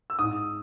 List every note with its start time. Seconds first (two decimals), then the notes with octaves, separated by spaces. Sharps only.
0.10 E6
0.19 G#2 D#6